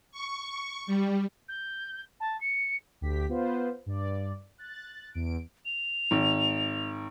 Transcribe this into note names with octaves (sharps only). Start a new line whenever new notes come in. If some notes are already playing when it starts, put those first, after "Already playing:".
C#6
G3
G6
A5
C#7
D2 G4 B6
B3 F4 B4 C5
G2 D5
F#6 A6
E2 D7
F7
G#1